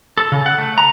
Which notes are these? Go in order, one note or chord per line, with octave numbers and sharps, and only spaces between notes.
A4
C#3
F#5
A3
A#5